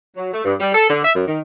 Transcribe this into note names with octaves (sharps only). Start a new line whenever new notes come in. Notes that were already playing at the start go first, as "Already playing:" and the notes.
F#3
A3
G2
G3
A4
D3
E5
F#2
D#3